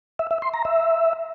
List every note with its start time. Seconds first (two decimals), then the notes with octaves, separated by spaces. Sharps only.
0.19 E5
0.31 E5
0.42 C6
0.54 A#5
0.65 E5